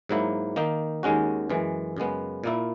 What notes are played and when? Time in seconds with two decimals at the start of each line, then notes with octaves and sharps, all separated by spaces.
0.09 G#2 F#3 A#3 E4
0.56 D#3 A#3 D#4
1.03 D#2 D#3 G#3 C#4 F#4
1.50 F#2 E3 G#3
1.97 F#2 C#3 G#3 B3
2.44 A#2 A#3 E4